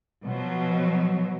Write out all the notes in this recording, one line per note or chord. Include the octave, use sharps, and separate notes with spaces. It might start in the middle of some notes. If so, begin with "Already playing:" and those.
B2 F3 F#3